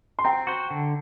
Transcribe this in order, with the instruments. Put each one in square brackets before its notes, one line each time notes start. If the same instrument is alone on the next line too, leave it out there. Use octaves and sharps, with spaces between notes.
[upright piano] C6
[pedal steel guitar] C4 [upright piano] G5 A#5
[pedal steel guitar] F#4 C5
D3